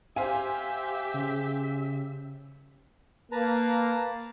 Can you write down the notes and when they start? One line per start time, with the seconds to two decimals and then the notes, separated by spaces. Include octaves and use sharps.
0.16 G4 C5 E5 F5 G#5
1.14 C#3
3.32 A#3 B4 A5 A#5